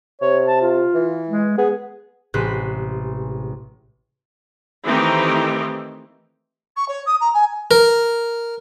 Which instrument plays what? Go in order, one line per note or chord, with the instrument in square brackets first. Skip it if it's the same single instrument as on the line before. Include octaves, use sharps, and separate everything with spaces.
[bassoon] C3 [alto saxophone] C#5
[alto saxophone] A5
F4
[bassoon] E3
[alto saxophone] G#3
[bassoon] B3 [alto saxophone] G#4
[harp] A1 C3 G#3 C6 F#6 B6
[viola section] D#3 E3 A3 C4 D#4 G4
[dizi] C#6
C#5
D#6
A#5
G#5
[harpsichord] A#4